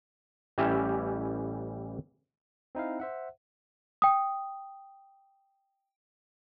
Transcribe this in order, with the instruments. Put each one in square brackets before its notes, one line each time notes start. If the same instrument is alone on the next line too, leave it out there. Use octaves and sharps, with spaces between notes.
[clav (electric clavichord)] A1 E3 G3 C#4 G4 E5
[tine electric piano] C4 D#4 E4 F5
C5 E5 F#5
[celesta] G5 D#6